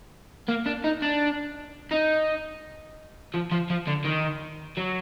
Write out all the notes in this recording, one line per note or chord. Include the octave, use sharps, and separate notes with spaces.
A#3
D4
D#4
D4
D#4
F3
F3
F3
D3
D#3
F#3